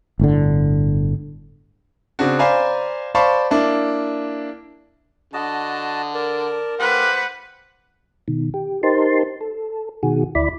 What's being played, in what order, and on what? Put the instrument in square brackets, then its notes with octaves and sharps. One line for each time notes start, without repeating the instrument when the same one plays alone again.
[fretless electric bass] G1 A2 D3
[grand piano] C#3 C4 D4 F#4
C5 D5 F5 G#5 A#5 B5
C5 D5 F5 A5 B5 C#6
A#3 D4 E4
[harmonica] D3 [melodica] F#4 D#5 A5
[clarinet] A#4 [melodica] D5 A5
[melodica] G4 F5 D6 [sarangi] B4 [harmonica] C5 F#5
[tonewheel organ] B2 D#3
G4
D#4 G4 A#4 C5 A5 C6
A4
B2 D#3 F#4 G#4
D2 E4 D5 B5